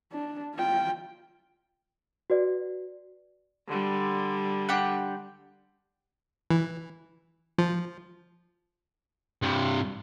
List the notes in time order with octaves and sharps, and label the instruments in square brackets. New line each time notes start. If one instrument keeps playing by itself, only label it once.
[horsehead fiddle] D4
F4 G5
[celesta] F#4 B4 D5
[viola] D3 G3
[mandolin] D4 G4 F#5
[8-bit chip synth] E3
F3
[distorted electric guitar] G2 C3